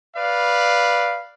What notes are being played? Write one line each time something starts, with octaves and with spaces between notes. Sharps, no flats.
B4 D5 F5